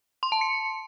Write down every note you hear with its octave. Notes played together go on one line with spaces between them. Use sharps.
C6
A5
C#7